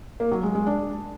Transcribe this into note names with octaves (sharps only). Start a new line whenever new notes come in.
A#3
F#3
G#3
G#3
D4